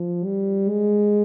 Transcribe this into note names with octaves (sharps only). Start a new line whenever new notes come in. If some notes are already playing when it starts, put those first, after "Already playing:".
Already playing: F3
G3
G#3